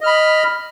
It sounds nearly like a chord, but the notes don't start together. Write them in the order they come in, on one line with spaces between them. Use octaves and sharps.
D#5 F6 B5